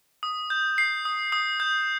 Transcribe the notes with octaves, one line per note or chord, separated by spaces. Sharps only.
D#6
G6
C7
D#6
D#6
G6